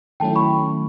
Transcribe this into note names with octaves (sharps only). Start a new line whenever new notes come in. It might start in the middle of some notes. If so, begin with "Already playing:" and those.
D#3 F#3 A3 C#4 E4 G5 A5
B5 C#6